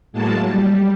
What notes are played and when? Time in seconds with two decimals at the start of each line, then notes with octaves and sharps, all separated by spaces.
0.12 A2 F#3 G#3 A#3 A5
0.45 G3